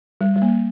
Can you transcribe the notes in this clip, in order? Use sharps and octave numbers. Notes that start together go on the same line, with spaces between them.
G3
G3
A#3